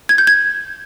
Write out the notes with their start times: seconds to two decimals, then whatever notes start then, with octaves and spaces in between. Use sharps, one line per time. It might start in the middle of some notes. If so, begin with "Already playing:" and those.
0.09 G#6
0.18 G6
0.27 G#6